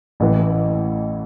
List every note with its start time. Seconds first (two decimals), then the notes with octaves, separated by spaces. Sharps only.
0.20 A1 A2 E3